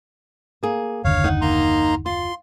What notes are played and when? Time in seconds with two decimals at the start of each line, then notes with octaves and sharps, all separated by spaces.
0.63 A#3 G#4
1.04 F#1 D#2 D3 C#5 F5
1.24 D#4 F#5
1.41 A#3 A#5 C6
2.06 F4 C6